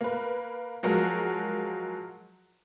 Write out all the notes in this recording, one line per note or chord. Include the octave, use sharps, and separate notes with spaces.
A#3 B4
F3 F#3 G#3 F#4 A#4